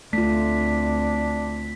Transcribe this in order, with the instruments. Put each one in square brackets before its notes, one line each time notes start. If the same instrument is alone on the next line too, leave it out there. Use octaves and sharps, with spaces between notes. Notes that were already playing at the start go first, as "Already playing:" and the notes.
[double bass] D2 C4 [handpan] A3 F4 [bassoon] D4 [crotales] B6